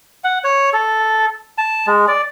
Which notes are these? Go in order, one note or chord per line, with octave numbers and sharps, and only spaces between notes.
F#5
C#5
A4
A5
G#3
D5